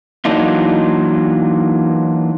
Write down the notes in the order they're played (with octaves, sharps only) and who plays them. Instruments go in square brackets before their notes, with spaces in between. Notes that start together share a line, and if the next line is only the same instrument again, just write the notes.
[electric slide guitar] E3 F#3 A#3 D4 D#4 F4